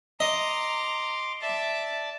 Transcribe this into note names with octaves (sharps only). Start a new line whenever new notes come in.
D#5 A#5 C6 D6
D5 E5 A5